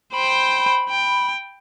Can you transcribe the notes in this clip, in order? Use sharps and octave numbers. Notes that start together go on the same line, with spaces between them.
C5 G5 B5
G5